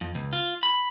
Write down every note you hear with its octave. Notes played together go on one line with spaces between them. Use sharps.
F2
C#2
F4
B5